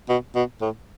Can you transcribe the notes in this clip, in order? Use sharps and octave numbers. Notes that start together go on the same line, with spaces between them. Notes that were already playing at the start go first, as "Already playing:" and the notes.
B2
B2
A2